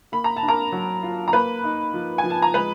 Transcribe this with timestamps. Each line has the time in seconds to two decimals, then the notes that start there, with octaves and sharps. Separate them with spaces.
0.12 A#3 B5
0.24 A#5
0.36 A5
0.43 D4
0.48 A#4 A#5
0.72 F#3
1.03 F4
1.28 A#5
1.33 A#3 B4 B5
1.64 D#4
1.93 F3
2.18 G#5
2.24 F3
2.30 A5
2.42 A#5
2.54 G#3 B4 B5